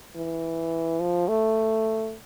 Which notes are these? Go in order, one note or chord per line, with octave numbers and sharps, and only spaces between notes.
E3
F3
A3